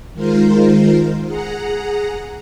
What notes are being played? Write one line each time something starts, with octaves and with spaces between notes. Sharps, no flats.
D#3 G#3 F4 A#4 C5
G#4 F#5 A#5